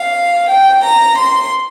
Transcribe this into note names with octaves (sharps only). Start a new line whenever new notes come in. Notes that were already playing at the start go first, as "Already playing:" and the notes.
Already playing: F5
G5
A#5
C6